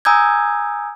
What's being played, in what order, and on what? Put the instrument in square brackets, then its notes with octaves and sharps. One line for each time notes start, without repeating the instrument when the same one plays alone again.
[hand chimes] G#5 A#5 D#6 E6 G6 G#6